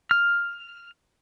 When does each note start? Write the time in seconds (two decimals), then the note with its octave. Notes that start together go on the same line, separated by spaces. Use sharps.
0.11 F6